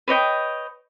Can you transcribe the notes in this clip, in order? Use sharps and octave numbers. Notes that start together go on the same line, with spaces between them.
B4 C#5 D#5 G5